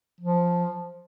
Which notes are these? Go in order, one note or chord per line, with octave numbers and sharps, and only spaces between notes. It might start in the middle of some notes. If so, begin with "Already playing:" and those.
F3